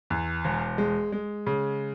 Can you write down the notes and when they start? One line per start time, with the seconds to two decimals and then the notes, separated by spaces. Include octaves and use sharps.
0.10 E2
0.44 E1
0.78 G#3
1.12 G#3
1.47 C#3